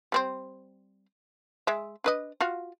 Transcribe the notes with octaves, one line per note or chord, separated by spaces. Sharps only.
G3 C4 C5
G#3 E5
D4 B4 D#5
F4 F#4 F5